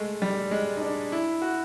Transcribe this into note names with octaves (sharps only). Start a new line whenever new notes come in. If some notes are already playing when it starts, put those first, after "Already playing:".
Already playing: G#3 A3
G3
G#3
D#4
D4
E4
F#4